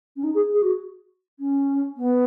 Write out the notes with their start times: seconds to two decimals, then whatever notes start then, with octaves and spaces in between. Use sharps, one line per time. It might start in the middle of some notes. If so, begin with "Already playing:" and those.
0.16 C#4
0.23 D#4
0.34 G#4
0.53 G#4
0.62 F#4
1.39 C#4
1.97 B3